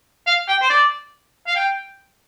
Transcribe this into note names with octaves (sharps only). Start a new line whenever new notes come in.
F5
G5
C5
D5
F5
G5